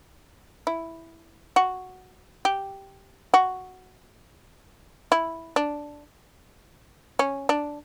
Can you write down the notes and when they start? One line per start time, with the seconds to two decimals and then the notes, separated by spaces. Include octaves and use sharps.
0.67 E4
1.56 F#4
2.45 G4
3.34 F#4
5.12 E4
5.56 D4
7.19 C#4
7.49 D4